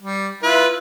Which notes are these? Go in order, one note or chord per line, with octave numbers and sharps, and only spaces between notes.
G3
E4 F4 B4